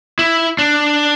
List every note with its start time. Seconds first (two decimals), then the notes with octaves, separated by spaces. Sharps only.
0.19 E4
0.59 D4